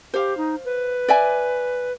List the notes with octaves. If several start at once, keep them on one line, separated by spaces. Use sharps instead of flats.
G4 C5 F5
D#4
B4
D5 E5 G#5